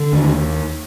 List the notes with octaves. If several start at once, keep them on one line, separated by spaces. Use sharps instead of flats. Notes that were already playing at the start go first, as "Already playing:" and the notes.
Already playing: D3
D#2